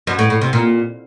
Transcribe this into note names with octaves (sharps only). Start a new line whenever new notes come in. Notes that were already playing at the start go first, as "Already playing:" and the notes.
F#2
A2
A2
C3
A#2